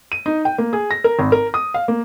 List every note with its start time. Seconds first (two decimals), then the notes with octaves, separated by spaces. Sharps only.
0.12 D#7
0.26 D#4
0.45 G5
0.58 A#3
0.73 G#4
0.91 A#6
1.04 A#4
1.19 G#1
1.32 A#4
1.54 D#6
1.74 F5
1.88 A#3